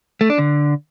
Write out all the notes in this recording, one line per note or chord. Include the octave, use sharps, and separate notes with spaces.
A3
D4
D3